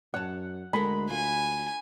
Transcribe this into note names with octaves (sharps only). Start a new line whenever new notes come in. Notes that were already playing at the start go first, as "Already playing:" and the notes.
F#2 C#5 F#5 A5
D2 G#3 A4 A#4 B5
F4 G#5